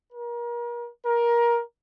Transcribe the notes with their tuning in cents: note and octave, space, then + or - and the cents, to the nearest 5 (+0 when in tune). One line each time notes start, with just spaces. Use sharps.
A#4 +35
A#4 +20